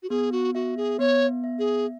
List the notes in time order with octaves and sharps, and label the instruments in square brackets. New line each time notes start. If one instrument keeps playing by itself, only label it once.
[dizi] F#4
[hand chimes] B3 [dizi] G#4
[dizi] F#4
[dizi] F#4 [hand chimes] E5
[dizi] G#4
[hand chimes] B3 [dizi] C#5
[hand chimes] E5
[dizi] G#4